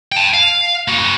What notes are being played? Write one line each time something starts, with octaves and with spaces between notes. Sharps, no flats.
G5 A5
F5
A#3 F#4